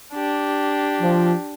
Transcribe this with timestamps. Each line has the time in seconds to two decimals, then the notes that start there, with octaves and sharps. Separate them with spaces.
0.13 D4 G4
1.00 F3